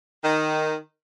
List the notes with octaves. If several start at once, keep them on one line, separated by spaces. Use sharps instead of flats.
D#3